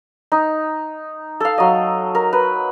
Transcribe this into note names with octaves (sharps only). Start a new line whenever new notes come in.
D#4
A4 F5
F#3 D#5
A#4
B4